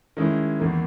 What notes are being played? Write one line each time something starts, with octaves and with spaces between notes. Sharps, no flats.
D#3 G#3 C#4 E4
E2 D#3 A#3